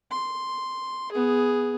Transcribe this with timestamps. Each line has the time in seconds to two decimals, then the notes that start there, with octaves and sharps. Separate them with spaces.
0.11 C6
1.12 B3 G#4